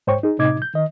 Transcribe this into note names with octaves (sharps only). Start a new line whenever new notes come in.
G#2 C5 C#5 G5 C#6
D#4 G#4
A2 C3 D#4 D#5 D6 G#6
G6
D#3 D#5